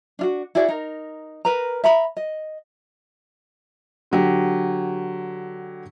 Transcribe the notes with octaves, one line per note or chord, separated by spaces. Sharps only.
D4 F4 F#4
E4 F#4 G#4 D5
D#4 A#4
A#4 B4 A#5
E5 A#5 B5
D#5
D3 F#3 G4